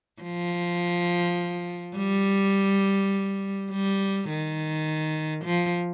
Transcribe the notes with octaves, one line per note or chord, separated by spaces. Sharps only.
F3
G3
G3
D#3
F3